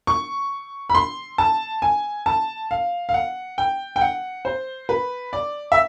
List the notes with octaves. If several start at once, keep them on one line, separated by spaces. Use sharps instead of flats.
C#6
B5
C6
A5
G#5
A5
F5
F5
F#5
G5
G5
F#5
C5
B4
D5
E5